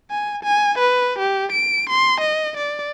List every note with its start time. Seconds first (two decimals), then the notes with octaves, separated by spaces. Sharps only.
0.11 G#5
0.43 G#5
0.79 B4
1.19 G4
1.52 D7
1.90 C6
2.21 D#5
2.57 D5